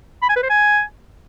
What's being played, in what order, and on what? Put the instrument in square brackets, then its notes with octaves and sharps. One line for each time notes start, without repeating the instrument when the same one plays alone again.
[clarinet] B5
G#5
B4
C5
G#5